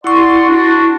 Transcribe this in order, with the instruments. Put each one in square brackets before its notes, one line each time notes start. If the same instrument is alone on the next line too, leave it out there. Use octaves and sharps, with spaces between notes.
[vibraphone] E4 C#6 [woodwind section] D5 F#5 C6
[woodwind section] D4 F#4